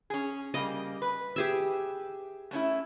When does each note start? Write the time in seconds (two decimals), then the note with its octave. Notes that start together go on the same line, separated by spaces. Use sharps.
0.10 C#4 G#4
0.54 C#3 G3 A#3 D#5
1.02 B4
1.36 G4 G#4 E5
2.51 A3 C#4 E4